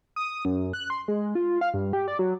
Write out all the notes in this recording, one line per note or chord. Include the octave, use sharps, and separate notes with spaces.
D#6
F#2
F#6
C6
G#3
F4
F5
G2
G4
D5
F#3